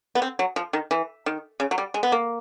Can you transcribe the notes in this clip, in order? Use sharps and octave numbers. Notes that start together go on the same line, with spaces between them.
B3
C4
F#3
F3
D#3
E3
D#3
C#3
F#3
G3
G#3
B3
A#3